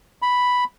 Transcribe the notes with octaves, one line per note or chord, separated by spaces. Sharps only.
B5